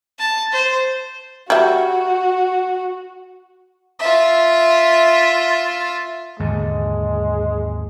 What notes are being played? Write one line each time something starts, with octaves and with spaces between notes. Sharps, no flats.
A5
C5
G3 F#4 E5
F4 E5
D#2 G#2 D3 G#3